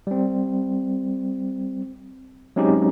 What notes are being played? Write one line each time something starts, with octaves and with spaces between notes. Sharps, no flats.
G3 C4
F#3 G#3 C4 C#4 D#4 G4